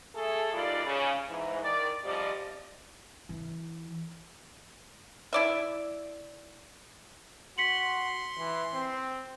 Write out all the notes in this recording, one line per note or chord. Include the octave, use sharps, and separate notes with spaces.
A3 G#4 A4
F#2 G3 D#4 F4 D5
C#3
G#2 E3
D#3 D5
G#2 C3 F3 G3 D5 D#5
E3
E4 D5 E5
F#4 C6 B6 C#7 F#7
E3
C4